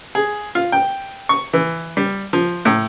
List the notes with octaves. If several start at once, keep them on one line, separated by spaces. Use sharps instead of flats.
G#4
F4
G5
C#6
E3
G3
F3
A2